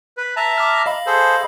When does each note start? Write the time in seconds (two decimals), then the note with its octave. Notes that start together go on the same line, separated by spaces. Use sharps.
0.17 B4
0.36 E5 A5 A#5
0.58 D6 F6
0.86 D#5 F5 B5
1.07 G#4 A4 C5